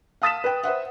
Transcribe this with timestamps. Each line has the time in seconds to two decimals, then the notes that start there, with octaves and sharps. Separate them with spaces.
0.22 F5 A5 D#6 A6 B6 E7
0.44 B4 G5
0.63 B4 C5 E5 F#5